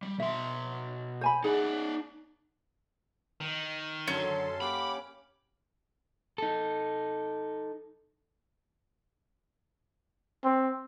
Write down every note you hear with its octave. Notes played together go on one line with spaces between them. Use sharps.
G3
B2 E5 C6
C5 G#5 B5
D#4 G#4 D5 F#5
D#3
F#2 D3 F#3 C#4 A4 C6
A#3 G4 F#5 B5 D6
D#4 A4
C4